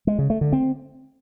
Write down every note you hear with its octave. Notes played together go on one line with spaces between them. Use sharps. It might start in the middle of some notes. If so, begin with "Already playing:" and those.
G#3
C#3
A3
D3
C4